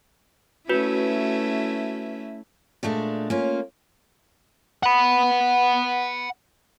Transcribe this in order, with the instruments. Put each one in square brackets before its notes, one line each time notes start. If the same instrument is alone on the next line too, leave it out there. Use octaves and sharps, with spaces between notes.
[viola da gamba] A3 C#4 E4 [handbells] F#4 B4
[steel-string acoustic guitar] A#2 G#3 A3 D4
A#3 C#4 F4
[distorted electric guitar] F#5 B5